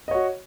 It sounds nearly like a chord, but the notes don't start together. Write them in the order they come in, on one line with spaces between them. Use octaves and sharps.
D#5 C#5 F#4